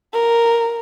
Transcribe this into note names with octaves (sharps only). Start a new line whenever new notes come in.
A#4